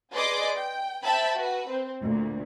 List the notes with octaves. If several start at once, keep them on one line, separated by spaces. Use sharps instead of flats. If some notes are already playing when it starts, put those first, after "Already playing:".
G#4 B4 D5 D#5 C6 D6
G5
C5 E5 G5 A5 B5
F#4 B4
C4
D2 A#2